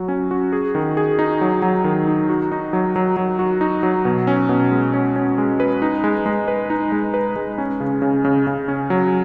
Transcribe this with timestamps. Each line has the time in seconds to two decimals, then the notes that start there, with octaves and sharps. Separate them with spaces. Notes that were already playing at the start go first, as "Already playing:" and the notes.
Already playing: F#3 F#4
0.08 C#4
0.31 F#4
0.52 G#4
0.75 D#3
0.97 G#4
1.19 D#4
1.41 F#3
1.62 F#3
1.84 D#3
2.07 D#4
2.29 F#4
2.52 D#4
2.73 F#3
2.96 F#3
3.17 F#3
3.39 F#4
3.61 D#4
3.83 F#3
4.05 B2
4.27 C#4
4.49 B2
4.71 G#3
4.94 C#4
5.16 C#4
5.38 G#3
5.60 B4
5.82 D#4
6.04 G#3
6.26 G#3
6.48 B4
6.70 D#4
6.92 G#3
7.14 B4
7.36 G#3
7.58 C#4
7.80 C#3
8.02 C#3
8.25 C#3
8.47 C#3
8.68 C#4
8.90 F#3